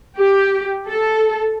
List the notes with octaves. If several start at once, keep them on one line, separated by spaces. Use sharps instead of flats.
G4
A4